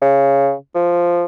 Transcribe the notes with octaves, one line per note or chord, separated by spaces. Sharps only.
C#3
F3